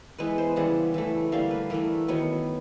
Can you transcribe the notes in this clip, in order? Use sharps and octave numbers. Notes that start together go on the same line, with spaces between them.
E3 G#3 B3 B4
C5
C#3 E3 G3 F#5
E3 A3
D3 G3 A#3 F5
B4
E3 A3 A#4
D#3 F#3 B3